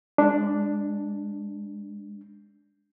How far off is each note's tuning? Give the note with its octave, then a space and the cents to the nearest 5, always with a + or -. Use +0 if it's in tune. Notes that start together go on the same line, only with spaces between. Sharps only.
G#3 -25 D4 +0